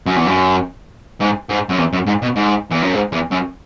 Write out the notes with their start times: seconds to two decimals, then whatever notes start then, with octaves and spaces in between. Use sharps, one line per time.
0.06 F#2
0.16 E2
0.26 F#2
1.21 G#2
1.49 G#2
1.69 F#2
1.78 E2
1.93 F#2
2.07 G#2
2.22 B2
2.36 G#2
2.71 E2
2.82 F#2
2.94 G#2
3.12 E2
3.31 F#2